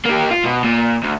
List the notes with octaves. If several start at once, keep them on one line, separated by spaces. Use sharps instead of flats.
A#3 G4
F4
B2
A#2
D2